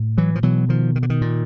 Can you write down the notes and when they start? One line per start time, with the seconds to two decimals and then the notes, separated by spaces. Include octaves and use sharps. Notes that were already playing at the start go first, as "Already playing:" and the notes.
Already playing: A2
0.18 E3 F#3
0.35 F3
0.43 B2 E3 F#3
0.69 D#3 F3
0.96 D#3
1.03 D3
1.10 D#3
1.21 A#2